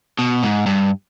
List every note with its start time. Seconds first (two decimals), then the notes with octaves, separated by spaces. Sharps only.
0.19 B2
0.43 G#2
0.66 G2